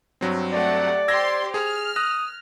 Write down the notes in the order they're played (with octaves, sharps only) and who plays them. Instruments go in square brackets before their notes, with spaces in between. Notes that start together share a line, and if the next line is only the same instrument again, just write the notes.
[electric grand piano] G2 F#3 C4
[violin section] A3 G4 F#5 [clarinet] D5
[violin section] G4 C5 C6 [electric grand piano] E6 G#6 A#6
[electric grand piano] G#4 [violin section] F6
[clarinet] D#6 [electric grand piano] F#6 A#6